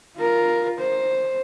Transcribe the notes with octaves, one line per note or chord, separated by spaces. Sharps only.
F4 A#4
C5